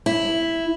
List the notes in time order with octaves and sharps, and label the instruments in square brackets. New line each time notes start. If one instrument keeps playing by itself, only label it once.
[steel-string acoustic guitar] E4